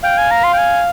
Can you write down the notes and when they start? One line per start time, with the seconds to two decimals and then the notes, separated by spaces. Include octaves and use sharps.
0.03 F5 G5
0.17 G#5
0.31 A#5
0.44 C6
0.54 G5
0.58 G#5